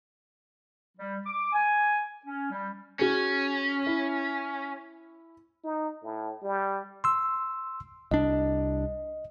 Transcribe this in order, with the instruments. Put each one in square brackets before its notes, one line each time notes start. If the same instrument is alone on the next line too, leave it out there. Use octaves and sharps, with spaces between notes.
[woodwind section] G3
D6
G#5
C#4
G3
[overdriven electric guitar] C#4 [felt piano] F#4 G#4
[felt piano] E4
[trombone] D#4
A2
G3
[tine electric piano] C6 E6
[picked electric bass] C2 D4 [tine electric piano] D#5